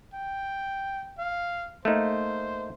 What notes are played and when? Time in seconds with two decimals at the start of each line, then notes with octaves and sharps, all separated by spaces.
0.13 G5
1.18 F5
1.85 A3 A#3 D#4 C5